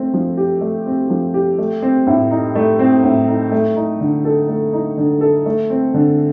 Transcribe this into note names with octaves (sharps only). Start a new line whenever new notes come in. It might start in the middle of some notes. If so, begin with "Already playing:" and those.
Already playing: A3 C4
F3
G4
A3
C4
F3
G4
A3
C4
A2
D#4
A3
C4
A2
D#4
A3
D#4
D3
A4
A3
D#4
D3
A4
A3
C4
D3